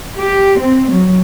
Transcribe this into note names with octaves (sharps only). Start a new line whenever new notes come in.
G4
C4
F#3